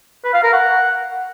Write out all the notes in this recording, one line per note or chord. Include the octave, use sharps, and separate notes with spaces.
B4
F5
A#4
F#5